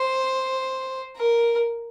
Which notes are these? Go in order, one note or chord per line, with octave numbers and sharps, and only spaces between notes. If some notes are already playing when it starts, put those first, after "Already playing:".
Already playing: C5
A#4